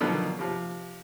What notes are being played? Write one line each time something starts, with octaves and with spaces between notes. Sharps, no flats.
B2 D3 D#3 F3 F#3 B3
C3 F3